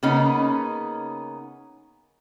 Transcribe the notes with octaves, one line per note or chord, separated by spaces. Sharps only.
C#3 A#3 B3 C#4 D#4